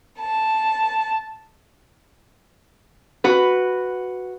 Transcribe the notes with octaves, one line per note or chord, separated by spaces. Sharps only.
A5
F#4 B4